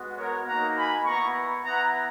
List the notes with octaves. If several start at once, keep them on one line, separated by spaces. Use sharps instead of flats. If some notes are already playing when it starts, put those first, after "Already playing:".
Already playing: G#3 B3 F#4
A#4 C#5
A#3 D#4 F#4 F#5 A#5
G#5 B5
B3 E4 A#5 C#6
B3 E4 F#5 A#5